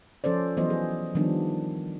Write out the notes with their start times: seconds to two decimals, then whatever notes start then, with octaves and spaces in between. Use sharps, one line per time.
0.24 F3 C#4 A4 C5 D5
0.57 E3 F#3 B3 C5 D#5
0.70 G#4
1.15 D#3 F3 G3 B3 D4